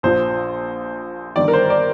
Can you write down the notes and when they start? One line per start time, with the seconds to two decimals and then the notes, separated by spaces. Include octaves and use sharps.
0.03 A#1 A#2 F3 C5
1.36 G1 G2 D#3 D5
1.48 A#4
1.53 C5
1.70 D5